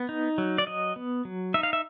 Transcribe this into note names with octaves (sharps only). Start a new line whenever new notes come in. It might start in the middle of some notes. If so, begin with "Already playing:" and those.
Already playing: B3
D#4
F#3
D5
F#3 D#5
B3
F#3
D#4 E5
F5
E5